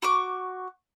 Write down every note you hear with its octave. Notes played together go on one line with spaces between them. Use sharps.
F#4 C#6 D6